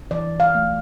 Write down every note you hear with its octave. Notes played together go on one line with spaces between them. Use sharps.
E3 D5
F5
A3